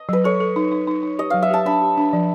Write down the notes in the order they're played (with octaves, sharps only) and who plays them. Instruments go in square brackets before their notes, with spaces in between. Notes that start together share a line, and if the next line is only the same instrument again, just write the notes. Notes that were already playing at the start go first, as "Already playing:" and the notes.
Already playing: [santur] D#5
[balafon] F#3 [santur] B4
[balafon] A4 [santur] C#5
[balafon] A4
D#4
D#4
D#4
D#4
[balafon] G4 [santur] D#5
[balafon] F#3 [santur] F5
[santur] E5
[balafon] G4 [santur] A5
[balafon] D4 [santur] B5
[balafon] G4
D4
F3